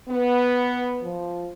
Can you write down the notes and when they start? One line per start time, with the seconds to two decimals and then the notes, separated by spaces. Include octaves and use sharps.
0.09 B3
1.01 F3